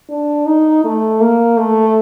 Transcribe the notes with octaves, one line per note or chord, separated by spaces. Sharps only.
D4
D#4
A3
A#3
A3